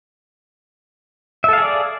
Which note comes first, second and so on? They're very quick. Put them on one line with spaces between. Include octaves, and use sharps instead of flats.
E5 A4 F5 G#4 D5